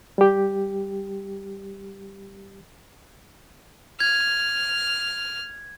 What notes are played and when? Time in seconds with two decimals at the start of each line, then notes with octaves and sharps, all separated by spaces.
0.18 G3 G4
4.00 F6 G#6